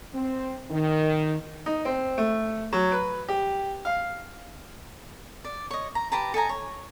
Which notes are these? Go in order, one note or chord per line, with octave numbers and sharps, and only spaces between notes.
C4
D#3
D#4
C4
A3
F#3
B4
G4
F5
D5
C#5 D#5
A#5
G4 B4 A5 A#5
A4 D#5 G#5 A#5
C#5